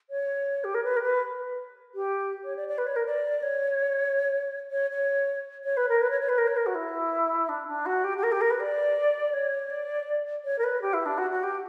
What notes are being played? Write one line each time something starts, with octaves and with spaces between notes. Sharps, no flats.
C#5
G4
A#4
B4
A#4
B4
G4
C#5
D5
D5
B4
C#5
A#4
D5
C#5
C#5
C#5
C#5
B4
A#4
B4
C#5
C#5
B4
A#4
C#5
A#4
F#4
E4
D4
D4
F#4
G4
G4
A#4
G4
A#4
B4
D5
C#5
D5
C#5
A#4
B4
G4
E4
D4
F#4
F#4
G4